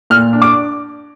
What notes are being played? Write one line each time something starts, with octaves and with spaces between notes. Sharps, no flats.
A#2 F6
D4
D6